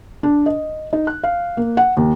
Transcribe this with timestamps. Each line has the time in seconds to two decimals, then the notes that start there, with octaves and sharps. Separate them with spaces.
0.23 D4
0.46 D#5
0.93 D#4
1.07 F#6
1.23 F5
1.57 A#3
1.77 F#5
1.97 D#2